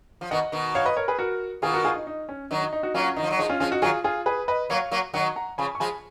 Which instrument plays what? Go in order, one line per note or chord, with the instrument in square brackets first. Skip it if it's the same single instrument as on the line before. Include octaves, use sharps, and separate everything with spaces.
[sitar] F3
[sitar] B2 D#3 [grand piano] D#5 F#5
[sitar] B2 D#3
[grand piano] C#5 F5
B4 D#5
A#4 C#5
G#4 B4
F#4 A#4
[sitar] B2 D#3 [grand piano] F4 G#4
[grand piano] F#4 A#4
F4 G#4
D#4
D#4
C#4
[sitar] D#3 F#3 [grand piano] D#4
[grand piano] D#4
D#4
D#4 F#4
[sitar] F#3 A#3 [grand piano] C#4 F4
[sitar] D#3 [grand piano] D#4
[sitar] F3
F#3
[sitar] F3 G#3 [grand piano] D#4
[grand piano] C#4 F4
[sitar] F3 G#3 [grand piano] C#4 F4
[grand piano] D#4 F#4
[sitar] D#3 F#3 [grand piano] F4 G#4
[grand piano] F4 G#4
G#4 B4
B4 D#5
[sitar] F#3 A#3 [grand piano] C#5 F5
[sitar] F#3 A#3
[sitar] D#3 F#3 [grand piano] D#5 F#5
[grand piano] F#5 A#5
[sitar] C#3 F3 [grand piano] G#5 B5
[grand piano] C#6
[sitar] F3 G#3 [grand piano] G#5 B5